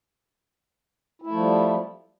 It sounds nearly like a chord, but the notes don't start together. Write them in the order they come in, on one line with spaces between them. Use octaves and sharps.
E4 A3 F3 G3